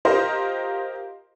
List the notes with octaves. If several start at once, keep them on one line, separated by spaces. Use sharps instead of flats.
F4 G4 A#4 C5 D#5